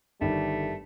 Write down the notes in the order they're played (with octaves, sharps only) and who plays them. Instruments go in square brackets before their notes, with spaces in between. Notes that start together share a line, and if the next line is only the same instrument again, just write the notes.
[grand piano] G1 D#3 [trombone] G3 [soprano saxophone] A3